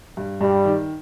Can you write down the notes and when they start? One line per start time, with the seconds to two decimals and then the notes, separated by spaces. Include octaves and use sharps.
0.17 G2
0.41 G2 G3
0.65 D#3